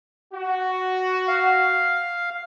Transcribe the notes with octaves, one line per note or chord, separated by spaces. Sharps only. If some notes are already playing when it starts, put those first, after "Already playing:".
F#4
F5